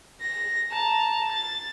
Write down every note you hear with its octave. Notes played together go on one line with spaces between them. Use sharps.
A#6
A5 A#5
A6